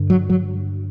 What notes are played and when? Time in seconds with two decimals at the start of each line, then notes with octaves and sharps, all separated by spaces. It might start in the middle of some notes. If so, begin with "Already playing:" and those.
Already playing: G2 D3
0.10 F#3
0.30 F#3